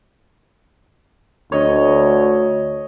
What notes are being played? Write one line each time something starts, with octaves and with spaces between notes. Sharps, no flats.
D2 C#5 D#5